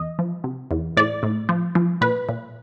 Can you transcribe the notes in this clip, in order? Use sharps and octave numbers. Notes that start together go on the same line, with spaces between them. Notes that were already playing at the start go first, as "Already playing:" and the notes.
Already playing: E2 D#5
F3
C3
E2
A2 D5
A2
F3
F3
A#2 B4
A#2